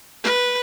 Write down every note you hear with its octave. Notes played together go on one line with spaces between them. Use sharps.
B4